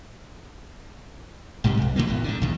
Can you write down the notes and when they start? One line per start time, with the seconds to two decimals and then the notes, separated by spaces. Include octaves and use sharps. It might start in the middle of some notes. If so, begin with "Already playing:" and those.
1.64 A#1 G#2 C3 G3
1.77 D#1 B1
1.96 F#2 F#3 A3 A#3
2.07 A1 E2 B2
2.24 G#2 D3
2.42 B1 E2 G#2